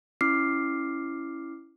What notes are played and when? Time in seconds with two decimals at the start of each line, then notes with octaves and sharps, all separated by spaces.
0.21 C#4 E4 D6 F6 C7